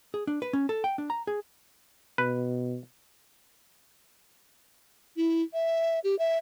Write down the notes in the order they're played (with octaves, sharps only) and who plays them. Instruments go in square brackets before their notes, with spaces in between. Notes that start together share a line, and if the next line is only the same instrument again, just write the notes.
[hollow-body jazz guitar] G#4
D4
B4
C#4
A4
G5
D4
A#5
G#4
[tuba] B2 [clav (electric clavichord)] B4
[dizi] E4
E5
G4
E5